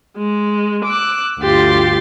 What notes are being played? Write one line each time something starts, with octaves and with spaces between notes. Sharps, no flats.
G#3
D6 E6 F#6
D2 G2 F4 G4 C6 A6